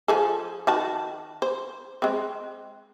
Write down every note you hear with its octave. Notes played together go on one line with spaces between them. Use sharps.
F3 G#4 A4
D#3 F#4 A5
C5
G#3 C4